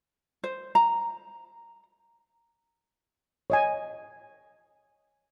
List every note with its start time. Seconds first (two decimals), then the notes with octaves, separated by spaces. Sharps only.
0.44 C5
0.75 A#5
3.50 C#5 D#5 G#5